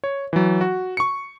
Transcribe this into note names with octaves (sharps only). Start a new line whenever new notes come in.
C#5
E3 F#3
F#4
C#6 C#7